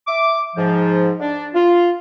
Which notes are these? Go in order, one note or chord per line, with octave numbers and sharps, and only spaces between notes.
E5 D6
G#2 F3
D4
F4